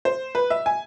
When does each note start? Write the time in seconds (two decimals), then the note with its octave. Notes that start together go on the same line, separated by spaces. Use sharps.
0.05 C5
0.35 B4
0.50 E5
0.66 G#5